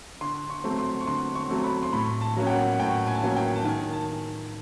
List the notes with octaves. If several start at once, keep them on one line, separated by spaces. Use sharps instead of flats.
D3 C6
C#6
F#3 A3 C4
C6
C#6
D3 C6
C#6
F#3 A3 C4
B5
C6
A2 B5
A5
F#3 A#3 C#4
G5
F#5
F#5
A2 G5
G#5
A5
F#3 A#3 C#4 G#5
G5
A5
D#3 G#5
A5